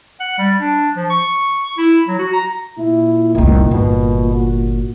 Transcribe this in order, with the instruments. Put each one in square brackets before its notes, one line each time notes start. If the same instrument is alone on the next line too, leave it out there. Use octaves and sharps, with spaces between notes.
[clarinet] F#5
G3
D4
F3
C#6
E4
F#3
F#4
A#5
[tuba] A#2 [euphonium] E4
[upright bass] F1 C2 [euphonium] D#3
[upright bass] G1 [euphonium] B2
[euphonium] F#4